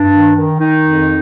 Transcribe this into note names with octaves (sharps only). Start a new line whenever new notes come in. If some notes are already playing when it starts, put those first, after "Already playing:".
Already playing: G2 D4
D#3
D#3
D#3 D#4
F2